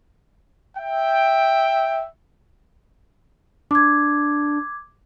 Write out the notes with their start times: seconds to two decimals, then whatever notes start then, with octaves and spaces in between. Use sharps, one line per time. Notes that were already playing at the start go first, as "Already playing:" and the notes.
0.77 E5 G5
3.71 D4 D6 G#6